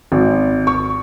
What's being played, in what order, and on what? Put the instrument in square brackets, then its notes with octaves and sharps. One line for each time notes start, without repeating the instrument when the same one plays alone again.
[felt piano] G#1
C#6